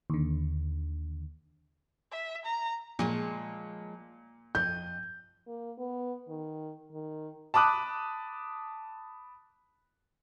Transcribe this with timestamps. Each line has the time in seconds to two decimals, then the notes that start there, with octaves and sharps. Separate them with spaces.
0.10 D#2 D3
2.11 E5
2.45 A#5
2.99 A#2 F3 G#3 C#5
4.55 F2 D#5 G6
5.47 A#3
5.78 B3
6.28 D#3
6.92 D#3
7.54 A5 B5 D6 D#6 F#6